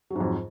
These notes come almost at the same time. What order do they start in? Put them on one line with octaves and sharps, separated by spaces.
F#3 G#2 F2